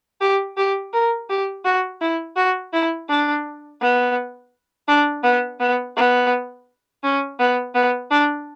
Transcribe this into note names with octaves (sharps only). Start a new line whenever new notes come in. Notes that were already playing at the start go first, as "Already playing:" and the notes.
G4
G4
A#4
G4
F#4
E4
F#4
E4
D4
B3
D4
B3
B3
B3
C#4
B3
B3
D4